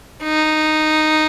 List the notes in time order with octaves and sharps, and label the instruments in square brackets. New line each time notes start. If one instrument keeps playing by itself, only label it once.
[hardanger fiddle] D#4